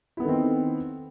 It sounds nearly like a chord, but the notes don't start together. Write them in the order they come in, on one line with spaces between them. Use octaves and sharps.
E4 B3 A4 D#3 C4